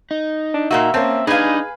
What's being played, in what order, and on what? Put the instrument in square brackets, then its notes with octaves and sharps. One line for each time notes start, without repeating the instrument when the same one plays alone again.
[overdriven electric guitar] D#4
[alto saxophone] D4
[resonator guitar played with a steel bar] A#2 A#3 F#4 [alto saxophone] E5
[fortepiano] A#3 C#4 A5 [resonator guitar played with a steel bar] C4
[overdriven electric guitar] D4 B5 [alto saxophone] D#4 [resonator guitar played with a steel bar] G#4 G#5 [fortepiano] B4 F5